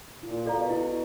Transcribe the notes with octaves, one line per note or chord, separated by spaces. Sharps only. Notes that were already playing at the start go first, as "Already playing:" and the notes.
A#2 E4
B2 A4 D5 F5 A#5
E4